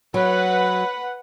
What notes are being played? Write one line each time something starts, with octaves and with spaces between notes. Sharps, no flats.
F#3 B4 F#5